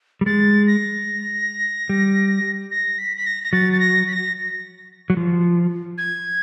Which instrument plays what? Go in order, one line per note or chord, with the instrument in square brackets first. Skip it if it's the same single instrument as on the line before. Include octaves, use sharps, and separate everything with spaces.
[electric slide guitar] G3
[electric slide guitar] G#3 [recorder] A6
[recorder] A#6
[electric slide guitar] G3
[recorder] A#6
B6
B6
A#6
A#6
[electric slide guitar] F#3 [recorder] A6
[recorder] A6
A#6
B6
A#6
[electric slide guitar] F#3
F3
[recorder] G#6